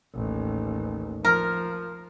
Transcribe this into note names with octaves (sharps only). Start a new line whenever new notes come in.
A1 D#2
F3 A#4